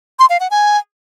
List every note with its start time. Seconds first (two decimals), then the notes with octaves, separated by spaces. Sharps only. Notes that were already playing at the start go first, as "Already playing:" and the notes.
0.19 C6
0.30 F5
0.40 F#5
0.51 G#5